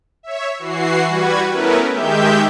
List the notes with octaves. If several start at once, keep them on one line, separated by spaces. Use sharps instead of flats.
C#5 E5
E3 F#4 C7
G3 F#4 B4 G#6
A3 B3 C#4 E4 A#4 B4
D#3 G#3 G4 E5 G6